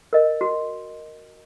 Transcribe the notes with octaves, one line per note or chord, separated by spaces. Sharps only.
A#4 D#5
F#4